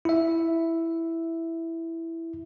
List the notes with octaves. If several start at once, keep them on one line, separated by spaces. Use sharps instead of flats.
E4 E5